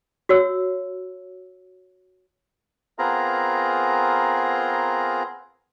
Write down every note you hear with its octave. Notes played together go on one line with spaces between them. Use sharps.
F#4 C#5 E6
B3 C4 F4 G#4 A#4 A#5